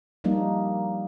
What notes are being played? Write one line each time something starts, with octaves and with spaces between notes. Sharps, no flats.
F3 G3 A#3 D4 D#4